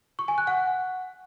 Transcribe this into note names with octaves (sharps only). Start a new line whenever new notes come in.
C#6
G#5
F#6
F#5